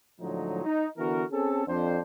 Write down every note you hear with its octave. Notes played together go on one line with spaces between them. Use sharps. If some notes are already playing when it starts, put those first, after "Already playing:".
A2 D3 F3 F#3 G#3 D#4
D#4
D3 E3 B3 F#4 A#4
C4 C#4 G#4 A4
F2 D4 C5